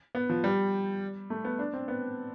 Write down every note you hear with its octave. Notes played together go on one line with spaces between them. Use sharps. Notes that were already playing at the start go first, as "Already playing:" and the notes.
B3
F3
G3
A3
B3
D4
C4
B3